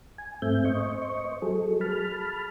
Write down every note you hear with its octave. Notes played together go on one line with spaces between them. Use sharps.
G#5
G#2 A3 C4 E5 G6
C5 D#5 C#6
F#3 G#4 A4
A5 B5 F6